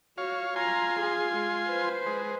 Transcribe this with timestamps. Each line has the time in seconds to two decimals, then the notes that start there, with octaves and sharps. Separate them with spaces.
0.18 F#4 C#5 F5
0.56 F4 G#5 A#5 C6
1.00 G#4
1.37 G#3
1.69 B4 C5
2.06 G#3